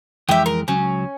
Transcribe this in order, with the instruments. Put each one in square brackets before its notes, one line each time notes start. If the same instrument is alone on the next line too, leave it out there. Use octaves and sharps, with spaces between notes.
[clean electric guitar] F2 E3 G#3 [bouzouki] G4 E5
[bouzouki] A#4
[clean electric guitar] C#2 F#3 [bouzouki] C#4